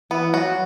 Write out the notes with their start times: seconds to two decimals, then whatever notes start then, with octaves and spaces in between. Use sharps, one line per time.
0.11 E3 B3
0.33 F#3 F#4